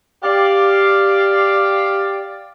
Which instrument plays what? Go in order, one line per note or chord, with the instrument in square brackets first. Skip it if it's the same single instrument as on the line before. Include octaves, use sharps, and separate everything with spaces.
[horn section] G4 D5 F5